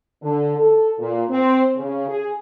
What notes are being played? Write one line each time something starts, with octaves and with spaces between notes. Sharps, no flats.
D3
A4
A#2
C4
C#3
G#4